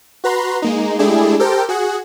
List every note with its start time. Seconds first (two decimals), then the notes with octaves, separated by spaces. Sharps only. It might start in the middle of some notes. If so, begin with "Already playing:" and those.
0.24 F#4 B4 A#5 C6
0.62 G#3 A#3 D#4
0.99 G#3 A3 D4 E4 G4 G#4
1.39 G4 A4 A#4 C5 G5
1.69 F#4 G#4 F#5